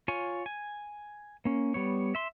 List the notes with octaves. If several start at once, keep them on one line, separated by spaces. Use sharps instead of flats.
F4 C#5 G#5
G#5
A#3 C#4
G3 B3 C#5
E5 C6